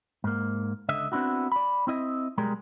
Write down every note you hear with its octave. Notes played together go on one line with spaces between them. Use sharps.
G#2 A#3
C#2 D3 D#5 E5
B3 C4 D4 E4 F#4
D5 B5
C4 E4 D#5 E5
B1 G3 G#3 A#4